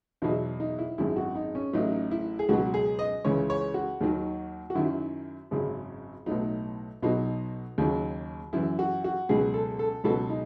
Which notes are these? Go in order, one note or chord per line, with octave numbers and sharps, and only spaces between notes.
E2 B2 F#3 D#4
D#4
E4
G#1 F#2 D#3 E4
F#4
D#4
C#4
A1 A2 F#3 D#4
E4
G#4
C#2 B2 F#3 F#4
G#4
D#5
C#2 C#3 E3 C#5
C#5
F#4
D#2 D#3 F#3
F#4
F#2 D#3 F#3 E4
G#1 F#2 C#3 F#3
B1 A2 F#3 D#4
B1 B2 F#3 D#4
D#2 C#3 F#3
F#2 E3 E4
F#4
F#4
C#2 B2 F#3 G#4
A4
A4
C#2 B2 F#3 A4
D#4